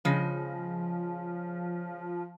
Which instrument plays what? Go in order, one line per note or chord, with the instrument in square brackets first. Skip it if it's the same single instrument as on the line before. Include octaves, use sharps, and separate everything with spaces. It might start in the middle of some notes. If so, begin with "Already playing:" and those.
[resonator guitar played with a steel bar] C#3 G#3 [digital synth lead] F3